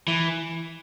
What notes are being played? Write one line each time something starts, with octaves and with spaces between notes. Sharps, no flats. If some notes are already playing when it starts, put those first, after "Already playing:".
E3